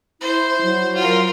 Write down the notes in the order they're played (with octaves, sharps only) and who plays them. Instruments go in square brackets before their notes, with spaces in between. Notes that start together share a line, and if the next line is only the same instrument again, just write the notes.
[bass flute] E4 [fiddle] C5
[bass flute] F#3
[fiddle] F4 A#4